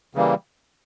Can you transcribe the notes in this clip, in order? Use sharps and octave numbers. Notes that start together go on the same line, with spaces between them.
C#3 E3 G3 A#3